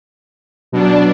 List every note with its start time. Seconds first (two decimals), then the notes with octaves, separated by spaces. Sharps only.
0.72 B2 F#3 D4